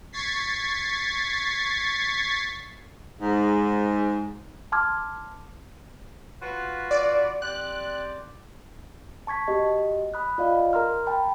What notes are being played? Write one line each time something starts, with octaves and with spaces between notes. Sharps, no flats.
C#6 G#6 A6 B6 C7
G#2
A5 C6 D6 F6 G#6
F4 F#4 B4
D5
C4 G4 D5 F#6
A5 C#6 G#6 B6
F#4 G4 D#5
B5 D#6 F#6
F4 D5 D#5 F5
A#4 A#5 C6 F6
G5 A5 B5